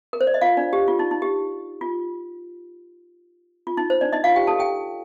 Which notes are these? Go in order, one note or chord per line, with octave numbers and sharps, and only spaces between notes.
A#4
C5
D5
D#5
F4 F5
D4 D5
G4
F4
D#4
D#4
G4
F4
F4
D#4
C5
D4 D5
D#4 D#5
F4 F5
G4 G5
A4 A5
G4 G5